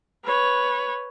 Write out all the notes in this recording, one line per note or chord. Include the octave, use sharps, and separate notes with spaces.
B4 C#5